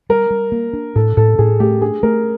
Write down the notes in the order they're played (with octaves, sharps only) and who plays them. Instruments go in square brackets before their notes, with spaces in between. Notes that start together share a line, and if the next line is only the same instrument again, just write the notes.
[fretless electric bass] G3 [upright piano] A#4
[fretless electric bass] G3
A#3
D4
[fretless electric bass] A2 [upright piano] A4
[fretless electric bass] A2 [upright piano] A4
[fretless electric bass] A2 [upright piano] G#4
[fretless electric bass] A3 [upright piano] G4
[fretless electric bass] D4 [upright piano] G#4
[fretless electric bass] A3 [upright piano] A#4